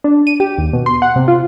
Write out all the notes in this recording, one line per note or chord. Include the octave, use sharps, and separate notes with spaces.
D4
D#7
G4
D#2
B2
C6
F#5
C3
F4